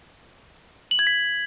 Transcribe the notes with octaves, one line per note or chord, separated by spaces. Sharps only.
F#7
G#6
B6